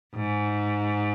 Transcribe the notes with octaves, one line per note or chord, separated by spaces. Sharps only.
G#2